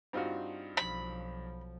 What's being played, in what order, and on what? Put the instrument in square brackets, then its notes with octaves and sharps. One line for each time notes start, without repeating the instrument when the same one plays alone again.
[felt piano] G2 D4 D#4 [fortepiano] C4 F4 F#4
[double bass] B1 F3 [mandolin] B5